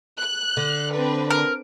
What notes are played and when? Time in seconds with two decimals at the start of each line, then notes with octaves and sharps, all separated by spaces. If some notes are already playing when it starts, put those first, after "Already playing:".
0.19 F#6
0.57 D3
0.93 C4 D4 B4
1.30 A#4